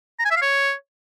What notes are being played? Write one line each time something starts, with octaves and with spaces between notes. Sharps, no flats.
A#5
G#5
E5
F5
C#5